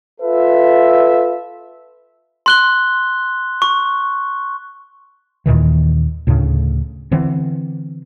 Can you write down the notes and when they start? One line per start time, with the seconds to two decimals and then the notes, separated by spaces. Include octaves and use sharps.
0.21 F4 A4 B4 E5
2.46 C6 F#6 G7
3.62 C#6
5.46 D#2 A#2 D#3 E3
6.27 D2 A2 C#3
7.11 D3 E3 B3 C4